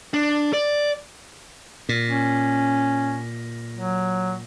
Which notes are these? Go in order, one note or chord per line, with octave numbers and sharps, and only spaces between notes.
D4
D5
A#2
C#4
F#3